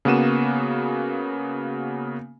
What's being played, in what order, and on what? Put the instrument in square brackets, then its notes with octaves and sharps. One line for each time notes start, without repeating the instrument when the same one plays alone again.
[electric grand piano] C#3 A#3 B3 F#4 D#7 E7